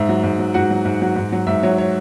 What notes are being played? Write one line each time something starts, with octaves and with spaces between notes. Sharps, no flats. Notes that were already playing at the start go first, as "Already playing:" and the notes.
Already playing: G#2 E5
F#3
G#2
F#3
G#2 F#4 F#5
F#3
G#2
F#3
G#2
F#3
G#2 E5
F#3 C#5
C#5